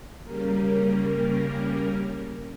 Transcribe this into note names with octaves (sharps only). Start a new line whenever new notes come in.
C#3 G3 A#3 C#4 A#4